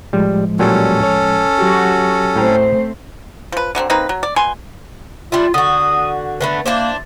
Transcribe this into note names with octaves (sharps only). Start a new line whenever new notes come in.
A2 F3 G3 G#3
A#2 F#3 G3 C#4 A4
C#5
F#3 F#4 G4
A2 A3 C4 C5 G5 A#5
F3 B4
D3 F#3 B3 C4
A#3 C4 D#4 B4
F#3
D5
B2 G#5 C6
G3 D4 E4 F4
D3 F#4 D#6
D3 A3 B3 B4
A#3 D4 E4 C5